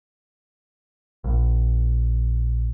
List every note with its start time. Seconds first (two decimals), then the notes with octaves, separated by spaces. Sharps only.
1.24 A#1